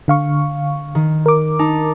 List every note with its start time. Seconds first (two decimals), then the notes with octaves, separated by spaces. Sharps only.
0.08 D3 F5 C#6
0.95 D#3
1.26 A#4 D6
1.59 D#4 A5